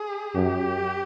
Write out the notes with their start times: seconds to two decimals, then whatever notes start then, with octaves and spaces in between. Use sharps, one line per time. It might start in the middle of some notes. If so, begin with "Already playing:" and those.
Already playing: G#4
0.35 F#2 G4